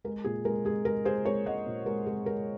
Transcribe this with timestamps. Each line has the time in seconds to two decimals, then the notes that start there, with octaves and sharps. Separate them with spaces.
0.04 G#3 A#4
0.24 A#2 G#4
0.45 G#3 A#4
0.65 G#3 G#4
0.85 G#3 A#4
1.05 G#3 G#4 C5
1.25 G#3 A#4 C#5
1.46 G#3 D#5 F#5
1.66 A#2
1.86 G#3 A#4
2.06 G#3 G#4
2.26 G#3 A#4